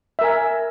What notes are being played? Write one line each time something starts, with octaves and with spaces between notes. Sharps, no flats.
A#4 E5 G#5